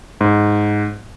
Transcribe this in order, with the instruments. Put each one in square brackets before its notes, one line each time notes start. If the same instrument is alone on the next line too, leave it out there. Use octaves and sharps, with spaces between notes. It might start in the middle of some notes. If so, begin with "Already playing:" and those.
[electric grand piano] G#2